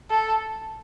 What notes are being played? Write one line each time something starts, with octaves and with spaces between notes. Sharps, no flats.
A4